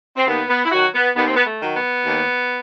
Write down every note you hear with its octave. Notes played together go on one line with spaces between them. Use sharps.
C4
D#2 B3
B3
E4
D#3 F#3 F#4
B3
D#2 B3
C4
B3
A3
D#3 F#3
B3
D#2